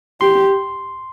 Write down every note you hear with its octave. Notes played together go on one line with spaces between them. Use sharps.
G4 C6